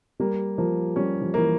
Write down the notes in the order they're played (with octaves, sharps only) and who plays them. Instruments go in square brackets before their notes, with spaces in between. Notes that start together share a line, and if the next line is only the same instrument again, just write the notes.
[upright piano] G3 [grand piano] A#3
[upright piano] F3 [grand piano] A#3
[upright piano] G3 [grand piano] C#4
[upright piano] F3
[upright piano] E3 [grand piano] A#3